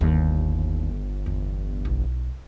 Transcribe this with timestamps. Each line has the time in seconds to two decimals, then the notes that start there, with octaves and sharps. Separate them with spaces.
0.01 G1 D#2
1.26 E2
1.85 B1 E4